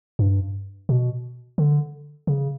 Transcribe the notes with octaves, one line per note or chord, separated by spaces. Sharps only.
G2
B2
D3
C#3